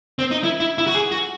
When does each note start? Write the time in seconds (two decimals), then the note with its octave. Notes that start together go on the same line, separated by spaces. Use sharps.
0.19 C4
0.31 D#4
0.44 E4
0.60 E4
0.78 E4
0.87 F#4
0.95 G#4
1.12 F#4